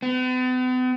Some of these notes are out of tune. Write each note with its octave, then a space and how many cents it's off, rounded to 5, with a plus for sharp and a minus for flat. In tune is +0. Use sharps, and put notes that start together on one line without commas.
B3 +45